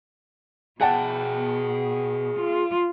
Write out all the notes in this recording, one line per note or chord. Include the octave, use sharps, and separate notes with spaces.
B2 G#4 D5 F#5 G5 A5
F4